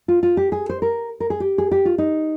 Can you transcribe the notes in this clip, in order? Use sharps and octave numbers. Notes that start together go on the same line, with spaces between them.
F4
F4
G4
G#4
C5
A#4
A#4
G#4
G4
G#4
G4
F4
D#4